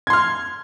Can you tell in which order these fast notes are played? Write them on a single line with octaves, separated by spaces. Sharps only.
G#6 C6 F6